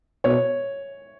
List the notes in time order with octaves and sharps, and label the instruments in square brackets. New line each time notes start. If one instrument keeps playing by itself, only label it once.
[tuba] B2 [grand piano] C#5